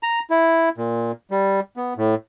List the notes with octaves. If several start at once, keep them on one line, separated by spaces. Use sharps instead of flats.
A#5
E4
A#2
G3
B3
A2